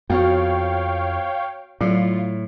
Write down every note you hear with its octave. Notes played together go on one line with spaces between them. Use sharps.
F2 B3 F#4 C#5 F5 G5
A2 F#3 F4